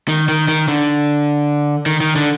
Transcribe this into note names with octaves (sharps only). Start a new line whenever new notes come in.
D#3
D#3
D#3
D3
D#3
D#3
D3